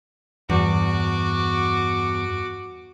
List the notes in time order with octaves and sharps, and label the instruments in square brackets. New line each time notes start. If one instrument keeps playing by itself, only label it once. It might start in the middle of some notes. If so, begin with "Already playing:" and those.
[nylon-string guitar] E2 [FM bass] G2 [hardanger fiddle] F#4 D6